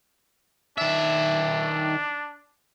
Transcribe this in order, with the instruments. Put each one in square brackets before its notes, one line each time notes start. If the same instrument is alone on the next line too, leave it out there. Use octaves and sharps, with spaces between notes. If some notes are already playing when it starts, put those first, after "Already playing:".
[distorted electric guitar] D#3 E5 [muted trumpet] D4